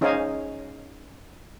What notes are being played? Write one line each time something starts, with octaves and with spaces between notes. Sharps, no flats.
C#4 D#4 G#4 C5 F5 G#5